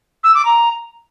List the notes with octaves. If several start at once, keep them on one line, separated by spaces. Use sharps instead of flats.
E6
D6
A#5